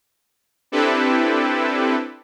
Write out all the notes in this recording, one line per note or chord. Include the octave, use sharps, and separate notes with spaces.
C4 D4 E4 G4 A4 B4